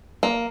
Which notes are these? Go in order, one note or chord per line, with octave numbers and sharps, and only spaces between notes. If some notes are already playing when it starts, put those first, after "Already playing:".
A#3